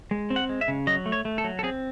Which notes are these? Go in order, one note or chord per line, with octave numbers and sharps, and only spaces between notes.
G#3
C4
F#5
G#3
E5
C#3
F#3 D#5
A3
C#5
A3
A4
F#3
A4
C4 G#4